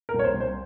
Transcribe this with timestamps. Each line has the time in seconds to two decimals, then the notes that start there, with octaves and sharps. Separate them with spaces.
0.09 A#4
0.14 C2
0.19 C#5
0.24 C5
0.34 C2
0.40 C5